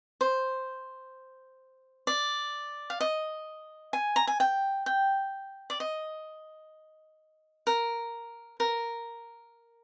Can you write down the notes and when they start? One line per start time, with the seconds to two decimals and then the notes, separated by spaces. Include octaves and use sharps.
0.21 C5
2.07 D5
2.90 F5
3.00 D#5
3.93 G#5
4.16 A#5
4.27 G#5
4.40 G5
4.86 G5
5.70 D5
5.80 D#5
7.67 A#4
8.60 A#4